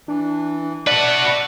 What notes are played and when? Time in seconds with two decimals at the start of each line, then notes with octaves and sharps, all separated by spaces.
0.08 E3 D4
0.87 F#4 B4 D5 E5 F#5 A5